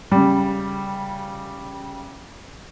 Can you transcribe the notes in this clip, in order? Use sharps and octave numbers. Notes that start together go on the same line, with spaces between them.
C#3 G3